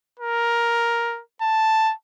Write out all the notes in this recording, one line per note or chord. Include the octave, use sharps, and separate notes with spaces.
A#4
A5